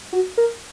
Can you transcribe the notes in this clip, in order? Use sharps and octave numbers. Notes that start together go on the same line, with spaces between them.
F#4
A#4